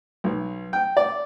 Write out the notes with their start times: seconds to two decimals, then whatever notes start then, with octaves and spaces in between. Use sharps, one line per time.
0.24 B1
0.73 G5
0.97 D5